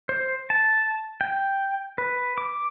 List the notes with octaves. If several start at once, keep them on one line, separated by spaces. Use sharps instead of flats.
C5
A5
G5
B4
D6